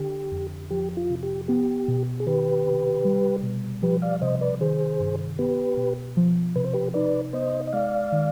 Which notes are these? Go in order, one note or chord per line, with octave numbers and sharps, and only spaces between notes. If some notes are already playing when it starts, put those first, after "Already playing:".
Already playing: D3 G4
F2
F3 G4
F4
C3
G4
B3 G4
B2
G#4
D#3 G4 B4
C3
G3
B2
F3 G4 B4
D5 F5
C3 C5 D#5
B4 D5
D#3 G#4 C5
G2
B3 G4 B4
B2
F3
C3 B4
C5
G4 B4
D#4 B4 D5
B3 C5 D#5
D#5
G#3 D5 F5
D#3